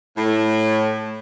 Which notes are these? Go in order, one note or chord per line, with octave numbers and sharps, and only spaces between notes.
A2